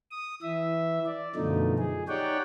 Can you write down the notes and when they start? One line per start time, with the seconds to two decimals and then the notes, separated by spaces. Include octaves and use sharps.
0.11 D#6
0.42 E3 E5
1.05 D5
1.36 F#2 B2 D3 F3 A3 D#4
1.78 G#4
2.08 D#4 G4 C#5 D5 F#5 G5